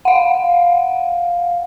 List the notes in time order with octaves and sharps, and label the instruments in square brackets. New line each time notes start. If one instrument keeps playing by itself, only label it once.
[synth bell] F5 F#5